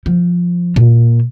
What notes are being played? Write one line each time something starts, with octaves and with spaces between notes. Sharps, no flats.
F3
A#2